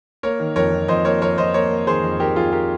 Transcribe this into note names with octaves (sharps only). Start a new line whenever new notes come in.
A#3 A#4 C#5
D#3
F2 A#4 C#5
F2
F2 C5 D#5
A#3 A#4 C#5
F2 A#4 C#5
F2 C5 D#5
A#3 A#4 C#5
A#3
D#3 G#4 C5
F2
D#3 G4 A#4
F2 F4 G#4
G4 A#4